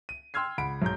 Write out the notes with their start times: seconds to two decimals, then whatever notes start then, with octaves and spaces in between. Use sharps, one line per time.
0.09 D#7
0.34 G5 C6 E6 F6 G#6 C7
0.58 C#2 F#5 B5 D7
0.82 B1 G#2 A#5 G6